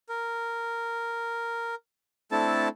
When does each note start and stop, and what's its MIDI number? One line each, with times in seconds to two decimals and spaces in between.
0.09 1.75 70
2.32 2.69 57
2.32 2.69 60
2.32 2.69 62
2.32 2.69 64
2.32 2.69 69
2.32 2.69 81